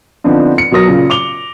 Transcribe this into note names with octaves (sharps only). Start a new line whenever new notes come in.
D3 F3 B3 C4 D4 D#4
C#7
B2 F#3 A#4 D#6 A#6
A#2 C#3
D6 F7 G7